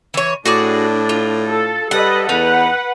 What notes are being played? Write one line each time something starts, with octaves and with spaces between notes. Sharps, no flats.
E3 C#5
A2 D4 F#4 G#4 D5
F4
A4
G3 A4 B4 D#5 F#5
E2 D#4 B4 F#5